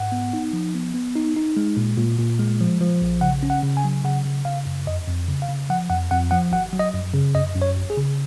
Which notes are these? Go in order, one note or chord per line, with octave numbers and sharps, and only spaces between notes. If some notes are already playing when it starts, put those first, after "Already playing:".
Already playing: G#2 F#5
B3
D#4
F3
B3
B3
D#4
D#4
G#3
A#2
A#2
A#2
G#3
F3
F3
A#1
C#3 F#5
C#4
F#5
C#3
G#5
F#3
C#3 F#5
C#3
C#3 F5
F#2
F2 D#5
F2
C#3
F5
C#3
F3 F#5
F2 F#5
F2 F#5
F3 F#5
G#1 F#5
F#3
D#5
F#2
C#3
F#2 D#5
F#2
C#5
G#1
G#4
C#3